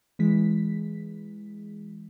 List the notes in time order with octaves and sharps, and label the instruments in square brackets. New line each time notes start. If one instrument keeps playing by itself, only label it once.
[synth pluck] E3 G#3 B6